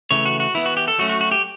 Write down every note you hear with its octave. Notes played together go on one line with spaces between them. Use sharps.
C#3 E3 A3 C#5
F#4
F#4
E3 B3 E4
F#4
G4
A4
F#3 A3 C#4 F#4
F#4
F#4
G4